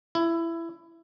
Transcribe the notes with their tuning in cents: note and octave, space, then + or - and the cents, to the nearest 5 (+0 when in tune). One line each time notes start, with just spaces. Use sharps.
E4 +15